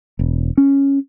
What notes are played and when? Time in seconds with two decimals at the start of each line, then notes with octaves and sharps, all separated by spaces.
0.19 E1
0.57 C#4